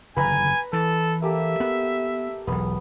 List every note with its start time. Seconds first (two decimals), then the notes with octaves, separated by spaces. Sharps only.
0.17 F#1 D3 D#3 B4 G#5 A#5 B5
0.73 E3 A4
1.22 A#3 G4 A4 E5
1.60 B3 F5
2.47 E1 B1 B3